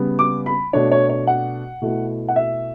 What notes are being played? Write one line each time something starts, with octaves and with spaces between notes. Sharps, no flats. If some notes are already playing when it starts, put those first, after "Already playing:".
Already playing: C#3 G3 B3
D6
B5
B2 A3 D4 C#5
C#5
C#5
F#5
B2 A3 E4
F#5
E5